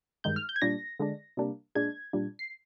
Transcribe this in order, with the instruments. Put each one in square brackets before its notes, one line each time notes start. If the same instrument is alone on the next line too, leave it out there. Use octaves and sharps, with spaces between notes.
[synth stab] G2 D#3 G#3 G6
F6
G6
G#6
A#2 G3 D4 A#6
D3 G#3 D4
C3 G3 A#3 D4
A#2 G#3 D4 G#6
A#2 G3 D4
C7